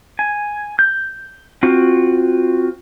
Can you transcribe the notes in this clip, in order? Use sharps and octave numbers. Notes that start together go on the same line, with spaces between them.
G#5
G6
C4 F4 F#4